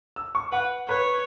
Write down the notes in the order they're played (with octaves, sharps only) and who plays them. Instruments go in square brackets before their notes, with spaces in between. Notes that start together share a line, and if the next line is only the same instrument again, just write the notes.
[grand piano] E6
C#6
[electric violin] B4 [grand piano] F#5
[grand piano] B4 [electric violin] C#5